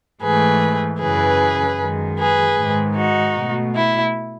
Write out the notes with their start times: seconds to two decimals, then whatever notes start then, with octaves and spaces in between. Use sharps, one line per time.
0.22 G#2 E3 A3 G#4 B4
1.00 F#2 C#3 E3 G#4 B4
1.79 F#2 D#3 G#3
2.18 G#4 B4
2.58 G#2 D#3 G#3
2.96 D#4 F#4
3.35 B2 A3
3.74 E4